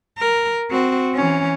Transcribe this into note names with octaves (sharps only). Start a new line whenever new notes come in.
A#4
C4 F#4
E3 C#4